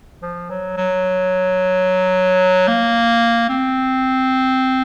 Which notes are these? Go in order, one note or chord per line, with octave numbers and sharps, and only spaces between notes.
F3
F#3
F#3
A#3
C4